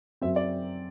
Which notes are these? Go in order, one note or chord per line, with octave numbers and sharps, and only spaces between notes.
F#2 F#3 C4 E5
D5